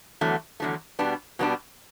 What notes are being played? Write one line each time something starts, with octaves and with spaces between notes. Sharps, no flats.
E2 D3 F#3 A3
E2 D3 F#3 A3
B2 G3 B3 D4
B2 G3 B3 D4